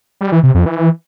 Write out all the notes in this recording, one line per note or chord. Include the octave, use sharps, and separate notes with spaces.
G3
E3
C3
F2
E3